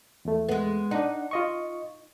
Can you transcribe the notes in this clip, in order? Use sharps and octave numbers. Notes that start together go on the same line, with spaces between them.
E2 A3
G#3 B3
D4 D#4 F#5
F4 D#5 C#6